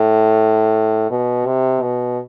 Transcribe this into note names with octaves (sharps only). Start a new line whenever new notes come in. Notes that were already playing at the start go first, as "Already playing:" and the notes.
Already playing: A2
B2
C3
B2